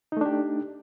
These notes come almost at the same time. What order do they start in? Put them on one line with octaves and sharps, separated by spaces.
D#4 A3 D4 G4